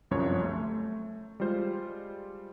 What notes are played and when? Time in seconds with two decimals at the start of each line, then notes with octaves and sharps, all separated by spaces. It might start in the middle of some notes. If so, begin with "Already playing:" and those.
0.11 G1 C2 F#2 F3 C#5
0.43 A3
1.40 G3 G#3 F4 C5